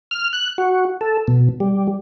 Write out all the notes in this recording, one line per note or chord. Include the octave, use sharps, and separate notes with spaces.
F6
F#6
F#4
A4
B2
G3